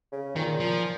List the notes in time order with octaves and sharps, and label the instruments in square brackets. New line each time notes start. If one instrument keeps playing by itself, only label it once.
[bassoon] C#3
[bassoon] A#2 [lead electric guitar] D#3
[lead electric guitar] F3